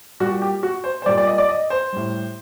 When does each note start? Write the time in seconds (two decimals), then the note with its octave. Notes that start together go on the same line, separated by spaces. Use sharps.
0.20 A#2 G3 F#4
0.42 G4
0.63 F#4
0.84 C5
1.02 C5
1.06 G3 D5
1.09 A#2
1.18 D5
1.27 D#5
1.38 D5
1.49 D#5
1.70 C5
1.93 A2 G3